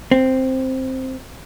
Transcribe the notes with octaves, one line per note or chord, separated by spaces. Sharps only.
C4